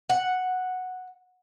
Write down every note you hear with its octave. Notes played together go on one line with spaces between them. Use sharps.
F#5